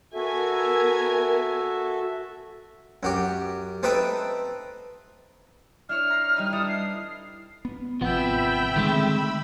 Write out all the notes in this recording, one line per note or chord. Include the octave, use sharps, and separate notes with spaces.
B3 F#4 A4 A#4 E5 G#5
F#2 F#4 G4
C4 D#4 A4 B4 E5 G5
D4 E4 C#5 F6
A#5 C7
G3 D#4 B4
D4 E4 A4 D#6
C7
B3
G#1 C3 F3 B3 E5 G5 B5 E6
D3 D#3 G#3 A3 C4